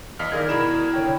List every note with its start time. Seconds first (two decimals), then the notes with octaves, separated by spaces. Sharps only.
0.19 E2 D#5 F5 F6 B6
0.32 D#3 G#4 A#4 D5 G#6
0.49 B2 E4 A#4 E7
0.93 D3 C#5 G5